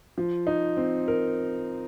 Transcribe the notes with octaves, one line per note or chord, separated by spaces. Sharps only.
F3
D#4
C4
A#4